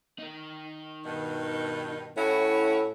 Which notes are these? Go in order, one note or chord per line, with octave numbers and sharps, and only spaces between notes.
D#4 A#4
G2 B2 D#3
A2 C#4 E4 F#4